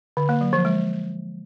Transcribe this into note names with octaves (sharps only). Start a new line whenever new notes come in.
D3
A#3
F#3
F3
G#3